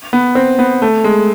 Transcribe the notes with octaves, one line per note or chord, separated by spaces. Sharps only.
B3
C4
B3
A3
G#3